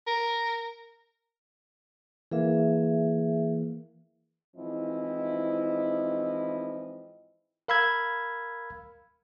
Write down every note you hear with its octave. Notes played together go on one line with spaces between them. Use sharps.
A#4
E3 A#3 G#4 E5
G#2 E3 F3 C4 E4 D#5
A#4 F5 B5 E6 G#6